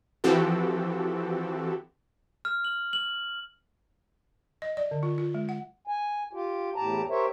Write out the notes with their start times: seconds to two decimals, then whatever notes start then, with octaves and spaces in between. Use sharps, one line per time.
0.24 E3 F3 C4 F#4 G4 A4
2.45 F6
2.65 F#7
2.93 F#7
4.62 D#5
4.77 D5
4.91 D3
5.03 F4
5.18 F4
5.34 G#3
5.49 F#5
5.87 G#5
6.33 F4 G4
6.76 E2 A2 G4 A5 A#5
7.09 G4 A#4 C5 C#5 E5